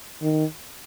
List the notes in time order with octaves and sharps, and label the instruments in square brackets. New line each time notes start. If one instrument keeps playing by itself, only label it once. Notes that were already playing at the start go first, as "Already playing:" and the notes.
[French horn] D#3